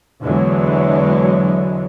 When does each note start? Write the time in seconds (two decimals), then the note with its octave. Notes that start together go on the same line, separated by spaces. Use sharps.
0.22 E2 D3 E3 F#3 G#3